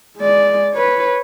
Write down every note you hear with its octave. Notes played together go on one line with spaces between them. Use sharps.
G#3 D5
B4 C#5